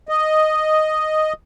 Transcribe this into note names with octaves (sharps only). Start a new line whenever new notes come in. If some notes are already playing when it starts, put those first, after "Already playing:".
D#5